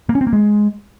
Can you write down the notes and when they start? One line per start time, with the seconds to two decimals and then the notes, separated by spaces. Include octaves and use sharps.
0.09 A#3
0.15 C#4
0.21 C4
0.27 A#3
0.33 G#3